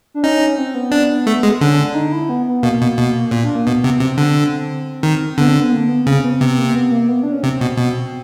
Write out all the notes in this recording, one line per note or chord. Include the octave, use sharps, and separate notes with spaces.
D4
C#4 D#4
C4
B3
D4
A3
G#3
D3 C#4
D4
D#4
E4
B3
B3
B2 A#3
B2
B2
A#2
D4
A#3
B2 B3
C3
C3 C4
D3
D#3
D3 B3
C4
B3
A#3
B3
C#3 C4
B3
C4
C3 B3
A#3
B3
A#3
B3
D4
C#4
C3 C4
B2
B2